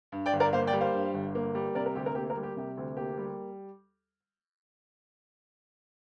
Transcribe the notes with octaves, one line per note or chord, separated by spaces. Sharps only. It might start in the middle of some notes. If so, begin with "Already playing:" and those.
G2
D5 G5
G1
A#4 D5
A#3 C5 F5
D5 G5
G3
C5 F5
G2
G1
A#3
G3
C3 A#4 D5
A#4
D2 G4
A#4
A#3 G4
A#4
G3
G4
C3 G4
D2
A#3 G4
G3